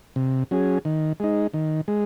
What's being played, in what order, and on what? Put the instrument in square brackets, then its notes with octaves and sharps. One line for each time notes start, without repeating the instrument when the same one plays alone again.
[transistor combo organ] C3
F#3 C#4 G#4
D#3
G#3 D#4
D#3
G#3